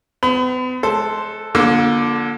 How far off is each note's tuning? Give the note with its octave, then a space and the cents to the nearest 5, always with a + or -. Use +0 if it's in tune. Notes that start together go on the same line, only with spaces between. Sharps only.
B3 +45 B5 +35
G#3 +35 A4 +0 C5 +0
D3 +0 F3 +0 A#3 +35